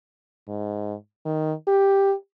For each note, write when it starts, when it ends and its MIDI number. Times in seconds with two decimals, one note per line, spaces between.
0.48 0.95 44
1.26 1.53 51
1.67 2.13 67